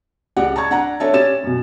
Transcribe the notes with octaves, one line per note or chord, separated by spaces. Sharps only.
C#2 G4 D5 F#5
A5 A#5 C#6 G#6
D4 F#5 A#5
D4 A4 C#5 E5 A5
C#4 G4 A6 E7
F#2 B2